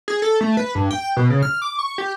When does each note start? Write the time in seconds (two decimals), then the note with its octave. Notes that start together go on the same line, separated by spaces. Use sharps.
0.08 G#4
0.22 A4
0.41 A3
0.57 B4
0.75 G2
0.91 G5
1.17 B2
1.30 C#3
1.43 F6
1.62 D6
1.79 C#6
1.98 G4